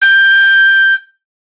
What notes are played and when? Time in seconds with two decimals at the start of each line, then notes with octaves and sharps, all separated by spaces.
0.02 G6